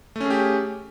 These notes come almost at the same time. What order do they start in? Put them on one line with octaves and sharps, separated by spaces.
A3 C#4 G#4 G4